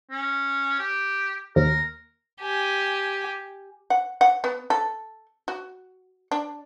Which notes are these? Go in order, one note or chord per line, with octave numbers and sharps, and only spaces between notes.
C#4
G4
D#2 A#4
G4 G#5
F#5
F#5
B3
A4
F#4
D4